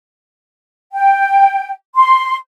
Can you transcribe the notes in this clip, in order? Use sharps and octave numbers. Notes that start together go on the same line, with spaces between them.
G5
C6